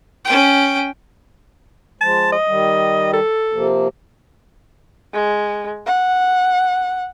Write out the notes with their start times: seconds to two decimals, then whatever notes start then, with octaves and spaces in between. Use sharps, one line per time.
0.25 C#4 G5
2.01 F3 G#3 A5
2.32 D#5
2.47 D#3 G3
3.13 A4
3.53 C3 F3 A#3
5.14 G#3
5.86 F#5